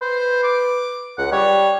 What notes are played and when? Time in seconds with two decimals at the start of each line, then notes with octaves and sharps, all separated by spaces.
0.02 B4 C5
0.44 D6
1.18 C#2 F#5
1.32 G3 C#5